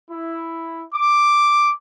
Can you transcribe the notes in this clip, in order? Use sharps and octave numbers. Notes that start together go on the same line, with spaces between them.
E4
D6